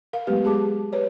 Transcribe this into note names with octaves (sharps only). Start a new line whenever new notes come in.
A#4 F5
F#3 G#3 A3 B3 G4 B4
G#3 G4 G#4 A5 D6
G4 B4 C#5 D5